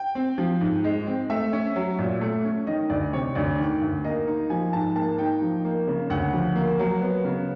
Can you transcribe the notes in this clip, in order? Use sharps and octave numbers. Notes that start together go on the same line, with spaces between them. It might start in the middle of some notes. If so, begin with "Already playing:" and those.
Already playing: G5
C4
F3
G#2
G#3
C4
A3 E5
C#4
F#3
A#2
A3
C#4
D#3 D#5
D2 D5
C3 C#5
D2 D5
D#3
D2
A#3 D#5
D#4
F3 G#5
G#2 A5
A#3 A5
D#4 G5
F3
A#3
C#3
D2 F#5
F3
A#3
F#3
B3
C#3